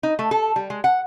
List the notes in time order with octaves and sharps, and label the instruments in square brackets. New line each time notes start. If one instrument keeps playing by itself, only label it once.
[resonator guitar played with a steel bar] D#4
A3
A4
G3
G#3
F#5